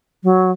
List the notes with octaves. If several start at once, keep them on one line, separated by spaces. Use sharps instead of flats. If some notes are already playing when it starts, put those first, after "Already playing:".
F#3